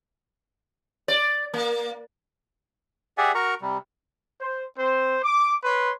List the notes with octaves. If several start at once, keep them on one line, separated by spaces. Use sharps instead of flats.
D5
A#3
G4 G#4 D5 E5 F#5 G#5
F#4 A#4 A#5 C#6
C3 G3
C5
C4 C5
D6
B4 C#5 C6